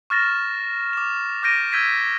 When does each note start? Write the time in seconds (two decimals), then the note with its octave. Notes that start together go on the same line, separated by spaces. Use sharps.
0.10 C#6 F6 A6 A#6 E7
0.93 D6 E7
1.43 D6 F6 G6 A#6 D7 D#7
1.72 E6 G6 G#6 B6 D#7